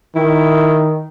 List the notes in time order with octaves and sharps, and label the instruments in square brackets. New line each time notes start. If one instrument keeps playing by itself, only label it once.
[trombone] D#3 [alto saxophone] E4